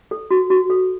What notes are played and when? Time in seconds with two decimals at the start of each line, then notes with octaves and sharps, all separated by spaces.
0.11 A4
0.31 F#4
0.50 F#4
0.70 A4